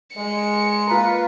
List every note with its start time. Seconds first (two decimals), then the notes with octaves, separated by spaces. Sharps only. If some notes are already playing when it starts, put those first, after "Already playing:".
0.16 G#3 C#7
0.87 A#3 F4 A#4 B4